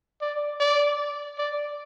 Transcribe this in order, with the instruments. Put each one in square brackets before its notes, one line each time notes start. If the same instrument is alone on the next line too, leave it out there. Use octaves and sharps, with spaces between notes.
[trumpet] D5
D5
D5